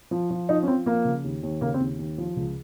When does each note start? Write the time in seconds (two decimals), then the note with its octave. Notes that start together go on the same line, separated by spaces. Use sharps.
0.11 F3
0.30 F3
0.49 F3 D#4
0.63 C#4
0.67 F3 C4
0.86 F3 A#3
1.05 C#3
1.24 D#2
1.43 D#2
1.61 C#3 A#3
1.74 C4
1.80 D#2
1.99 D#2
2.18 F3
2.36 C#2